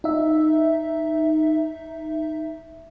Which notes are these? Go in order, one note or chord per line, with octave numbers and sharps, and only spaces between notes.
D#4 E5